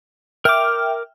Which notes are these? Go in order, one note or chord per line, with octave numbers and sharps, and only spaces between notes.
A#4 E5 G5 D6 F6